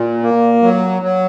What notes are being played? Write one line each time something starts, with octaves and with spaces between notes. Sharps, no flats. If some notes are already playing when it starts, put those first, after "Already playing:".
Already playing: A#2
A#3
F#3
F#3